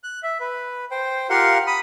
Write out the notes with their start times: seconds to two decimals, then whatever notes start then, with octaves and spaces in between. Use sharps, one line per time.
0.04 F#6
0.23 E5
0.40 B4
0.91 C5 G5
1.30 F4 G4 A#4 F5 F#5 C6
1.67 B5 D#6